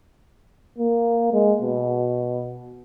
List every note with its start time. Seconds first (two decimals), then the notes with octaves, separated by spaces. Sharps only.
0.78 A#3
1.33 G#3
1.62 B2